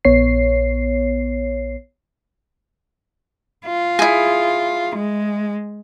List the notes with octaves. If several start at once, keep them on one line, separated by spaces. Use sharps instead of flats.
A#1 B3 C#5 C7
F4
E4 G#4
G#3